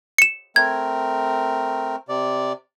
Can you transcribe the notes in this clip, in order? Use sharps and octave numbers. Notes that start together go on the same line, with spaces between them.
C#7 E7
A3 C4 A#4 G#6
C3 D5